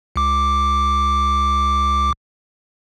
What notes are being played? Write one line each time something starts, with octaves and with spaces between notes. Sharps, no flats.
C#2 D6